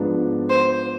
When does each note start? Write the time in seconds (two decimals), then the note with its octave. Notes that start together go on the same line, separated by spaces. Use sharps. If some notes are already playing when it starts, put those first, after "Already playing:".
Already playing: G#2 F3 B3 D4
0.50 C5